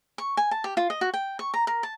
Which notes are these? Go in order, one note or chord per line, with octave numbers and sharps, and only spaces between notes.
C#6
G#5
A5
G4
F4
D#5
F#4
G5
C#6
A#5
A#4
A5